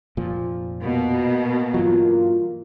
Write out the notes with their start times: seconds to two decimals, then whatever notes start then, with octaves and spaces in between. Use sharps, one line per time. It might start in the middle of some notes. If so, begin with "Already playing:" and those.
0.17 F1 A#2 F3
0.82 B2 A#3
1.74 G2 E3 F#3 F4